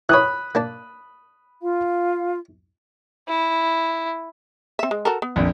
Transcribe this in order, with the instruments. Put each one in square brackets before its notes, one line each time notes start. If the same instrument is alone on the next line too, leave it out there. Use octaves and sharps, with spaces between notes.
[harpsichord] E3 C#5 [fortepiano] B5 D#6 F#6
[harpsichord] A#3 D4 A5
[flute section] F4 F5
[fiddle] E4
[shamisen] C4 E5
G#3
F#4 A4 A#4
B3
[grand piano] A#1 F2